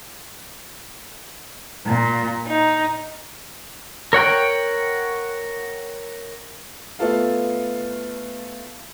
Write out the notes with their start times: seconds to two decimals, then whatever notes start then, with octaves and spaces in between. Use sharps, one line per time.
1.86 A#2
2.46 D#4
4.13 A#4 C#5 F#5 G5
6.99 A3 B3 F4 A4 F5